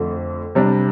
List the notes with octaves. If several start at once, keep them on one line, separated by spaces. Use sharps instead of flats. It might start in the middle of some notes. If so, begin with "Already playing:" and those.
Already playing: F2 D3 A3
C3 G3 D4